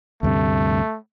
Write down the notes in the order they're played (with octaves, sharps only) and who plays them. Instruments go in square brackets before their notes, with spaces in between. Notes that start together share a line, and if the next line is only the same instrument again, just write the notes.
[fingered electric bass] D2 G2 C3 [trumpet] A3